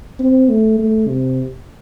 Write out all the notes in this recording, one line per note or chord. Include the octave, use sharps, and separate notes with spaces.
C4
A3
A3
C3